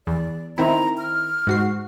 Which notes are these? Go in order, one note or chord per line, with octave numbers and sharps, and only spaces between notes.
E2 D5
D#3 C4 E4 A#5
F6
G#2 F#4 C7